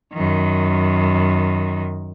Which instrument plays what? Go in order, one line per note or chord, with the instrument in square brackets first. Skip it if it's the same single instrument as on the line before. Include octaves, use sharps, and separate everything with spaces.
[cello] F#2 D#3